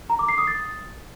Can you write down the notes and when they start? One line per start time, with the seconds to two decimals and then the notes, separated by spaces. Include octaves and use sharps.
0.10 A#5
0.19 D6
0.29 C7
0.38 D#6
0.47 A6